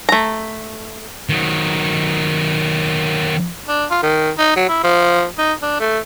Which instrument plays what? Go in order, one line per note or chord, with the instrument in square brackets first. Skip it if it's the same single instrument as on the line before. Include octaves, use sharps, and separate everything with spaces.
[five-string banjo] A3 A#5
[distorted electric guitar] D#3 F#3
[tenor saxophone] D4
F4
D#3
D#4
F#3
E4
F3
D#4
D4
A3